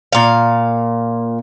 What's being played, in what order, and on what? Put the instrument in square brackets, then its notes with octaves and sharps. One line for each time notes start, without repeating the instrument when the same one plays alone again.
[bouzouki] A#2 F5